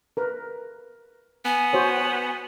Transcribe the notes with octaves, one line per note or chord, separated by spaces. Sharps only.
A#4 B4
B3 G#5
F#4 C5 C#5